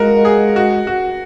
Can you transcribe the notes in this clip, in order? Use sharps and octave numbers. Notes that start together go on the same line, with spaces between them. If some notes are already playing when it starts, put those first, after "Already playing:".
Already playing: G#3 F4 F#4 A#4
G#4
F#4
F#4